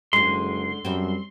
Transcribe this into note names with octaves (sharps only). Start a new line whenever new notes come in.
F#1 D3 G#3 C6
F#2 G3 C4